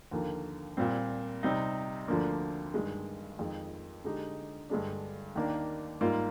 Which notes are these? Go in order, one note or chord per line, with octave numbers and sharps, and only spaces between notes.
D#2 D3 F3 A#3
A#2 G3 C4
C3 G3 C4 D#4
D2 D3 F3 A#3 D4
G2 D#3 G#3
F2 D#3 G#3
D3 G#3 D#4 G4
G2 D3 G#3 D4
D#2 D#3 A#3 D4
G#2 G3 A#3 F4